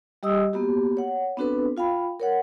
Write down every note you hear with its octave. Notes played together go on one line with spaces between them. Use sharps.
G3 G4 D#5 D#6 E6
A#3 B3 F#4 G4
C#5 F#5
B3 C4 D4 F#4 A4 B4
F4 F5 G5 B5
A#4 C#5 F#5